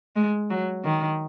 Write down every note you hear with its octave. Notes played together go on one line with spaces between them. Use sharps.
G#3
F#3
D#3